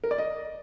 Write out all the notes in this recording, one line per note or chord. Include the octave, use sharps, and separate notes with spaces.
A#4
D5
D#5